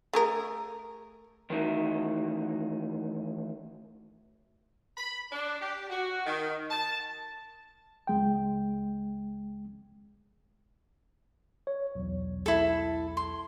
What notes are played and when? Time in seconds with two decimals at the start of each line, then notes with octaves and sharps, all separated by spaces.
0.13 A3 G#4 A#4
1.50 D#3 E3 A3 D#4 F#4 A#4
4.97 B5
5.31 D4
5.61 G4
5.90 F#4
6.25 D#3
6.71 A5
8.07 C#2 G#3 G5
11.67 C#5
11.95 B1 E2
12.46 E4 A4
13.17 C6